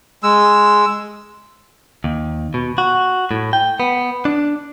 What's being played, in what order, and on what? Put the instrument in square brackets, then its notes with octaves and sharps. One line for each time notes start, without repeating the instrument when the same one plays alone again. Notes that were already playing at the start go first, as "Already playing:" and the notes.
[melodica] G#3 E6
[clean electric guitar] D#2
B2
F#4
A2
G5
B3
D4